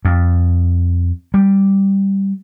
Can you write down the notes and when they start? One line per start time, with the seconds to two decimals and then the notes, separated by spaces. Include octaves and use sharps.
0.05 F2
1.34 G3